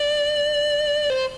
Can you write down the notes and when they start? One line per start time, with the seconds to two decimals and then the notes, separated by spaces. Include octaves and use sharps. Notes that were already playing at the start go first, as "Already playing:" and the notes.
Already playing: D5
1.10 C5